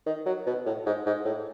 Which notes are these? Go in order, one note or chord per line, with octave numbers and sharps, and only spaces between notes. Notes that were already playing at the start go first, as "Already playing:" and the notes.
D#3
F#3
B2
A2
G#2
G#2
A2